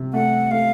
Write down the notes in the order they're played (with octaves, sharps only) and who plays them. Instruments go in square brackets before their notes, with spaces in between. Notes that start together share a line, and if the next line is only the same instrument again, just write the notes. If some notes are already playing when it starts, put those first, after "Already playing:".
Already playing: [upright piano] C3
[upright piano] A3 [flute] F#5
[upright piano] A3 [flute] F5